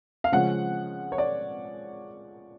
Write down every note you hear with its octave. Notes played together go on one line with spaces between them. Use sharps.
F5
C#3 F3 G#3 C#4 F#5
C#5
D5